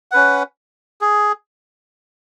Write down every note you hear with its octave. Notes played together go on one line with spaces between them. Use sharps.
C#4 B4 F#5
G#4